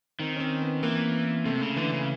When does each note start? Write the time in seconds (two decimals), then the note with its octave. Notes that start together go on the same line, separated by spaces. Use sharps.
0.20 D#3 C4
0.36 C#4
0.40 C4
0.62 B3
0.83 E3 A#3
1.45 C3 A3
1.62 C#3
1.76 D3 E3
1.92 C#3